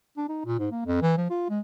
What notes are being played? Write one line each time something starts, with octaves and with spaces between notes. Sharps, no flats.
D4
D#4
A#2
G#2
A#3
F2
E3
F3
F4
G#3